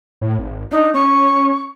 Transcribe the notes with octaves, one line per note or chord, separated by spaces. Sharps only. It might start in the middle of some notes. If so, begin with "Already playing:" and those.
A2
G#1
D4 D#4
C#4 C#6